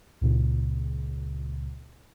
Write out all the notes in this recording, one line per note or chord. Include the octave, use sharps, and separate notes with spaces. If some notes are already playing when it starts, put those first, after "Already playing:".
C#2 A#2 C#3